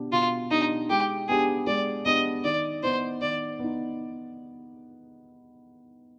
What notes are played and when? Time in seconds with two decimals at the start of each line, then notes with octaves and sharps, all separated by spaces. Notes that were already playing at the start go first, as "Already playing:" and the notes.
Already playing: B2 B3 D4 G4
0.12 B2 F4
0.51 B3 D4 D#4 G4
0.90 G#3 G4
1.28 B3 D4 G4 G#4
1.67 G#3 D5
2.06 B3 D4 G4 D#5
2.44 D#3 D5
2.83 B3 D#4 C5
3.21 D#3 D5
3.59 B3 D#4